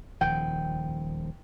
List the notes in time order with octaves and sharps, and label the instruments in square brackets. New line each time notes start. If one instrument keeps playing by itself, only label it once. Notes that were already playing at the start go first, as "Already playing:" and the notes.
[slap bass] D#1 D#3 F3 [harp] G5